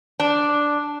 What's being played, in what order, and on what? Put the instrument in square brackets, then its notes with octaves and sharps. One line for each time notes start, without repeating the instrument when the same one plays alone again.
[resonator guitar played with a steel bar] D4